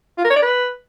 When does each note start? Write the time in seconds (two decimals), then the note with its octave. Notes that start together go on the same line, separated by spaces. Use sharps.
0.18 F4
0.24 A#4
0.30 C#5
0.36 D5
0.42 B4